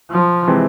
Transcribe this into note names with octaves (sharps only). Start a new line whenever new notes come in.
F3
C3 E3 G#3 C4